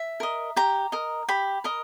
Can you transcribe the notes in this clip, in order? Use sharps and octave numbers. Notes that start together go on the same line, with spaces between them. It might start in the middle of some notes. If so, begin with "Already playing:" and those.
Already playing: E5
A#4 D#5
G4 A#5
A#4 D#5
G4 B5
A#4 D#5